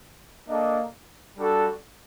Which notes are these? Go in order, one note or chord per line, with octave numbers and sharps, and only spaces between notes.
A#3 D4 A4 D#5
G3 D4 F#4 A4